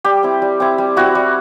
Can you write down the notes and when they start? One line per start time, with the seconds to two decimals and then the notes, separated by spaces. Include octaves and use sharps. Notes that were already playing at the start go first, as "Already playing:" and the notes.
0.04 G3 G4
0.23 C4 E4
0.42 G3
0.60 C4 E4
0.78 G3
0.97 C4 E4 F#4
1.15 G3